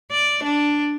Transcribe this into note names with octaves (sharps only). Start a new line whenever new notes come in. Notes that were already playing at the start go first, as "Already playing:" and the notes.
D5
D4